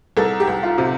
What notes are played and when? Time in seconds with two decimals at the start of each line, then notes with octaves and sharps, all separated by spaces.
0.17 C2 A4
0.40 G4
0.48 C2
0.63 F4
0.78 C3